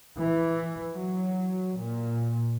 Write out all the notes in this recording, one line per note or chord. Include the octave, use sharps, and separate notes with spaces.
E3
F#3
A#2